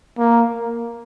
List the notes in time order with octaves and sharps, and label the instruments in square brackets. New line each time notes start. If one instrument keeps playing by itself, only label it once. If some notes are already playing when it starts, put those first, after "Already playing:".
[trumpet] A#3